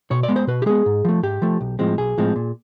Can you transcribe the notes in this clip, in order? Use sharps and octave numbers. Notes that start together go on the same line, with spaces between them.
B2 C#5
D5
G#3 B3
C5
B2 B4
G4
G#3 B3 G#4
G#2
F3 A3
G#2 G4
F3 A3
B1
A2 F3 G#3 C4
B1 G#4
A2 F3 G#3 C4
A#2